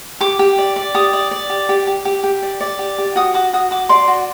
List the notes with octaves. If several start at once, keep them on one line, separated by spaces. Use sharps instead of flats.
G4 D6
G4
D5
D5
G4 D#6
D5
D5
G4
G4
G4
G4
G4
D5
D5
G4
G4
F#4 D#6
F#4 D6
F#4 D#6
F#4 D6
D5 C6
F#4